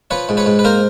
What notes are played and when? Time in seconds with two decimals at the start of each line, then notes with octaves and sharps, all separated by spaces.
0.11 F3 B4 C#5
0.29 G#2
0.37 B4 C#5
0.46 G#2
0.59 B4
0.64 A#3 A#4 C5